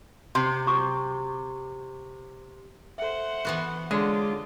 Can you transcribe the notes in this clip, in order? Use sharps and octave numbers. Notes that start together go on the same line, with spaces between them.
C3 C6
F#4 C#6 D6
A4 C5 E5 F#5
E3 B3 F#4
D3 G#3 F4 C#5 G#5 D6